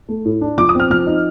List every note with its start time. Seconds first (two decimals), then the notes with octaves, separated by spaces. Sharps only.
0.09 A3
0.25 A2
0.41 D4
0.58 F3 D6
0.69 D#6
0.75 C4 F6
0.90 F3 F6
1.07 D#4